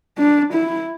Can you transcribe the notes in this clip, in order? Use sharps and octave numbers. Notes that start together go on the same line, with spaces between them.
D4
E4